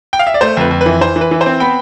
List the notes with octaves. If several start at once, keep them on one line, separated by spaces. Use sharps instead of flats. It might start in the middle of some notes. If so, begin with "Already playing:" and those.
G5
F5
E5
D5
A3 C5
F2 B4
F2
B4
E3
E3 C5
E3
B4
E3
C5
C4
B3 G5 B5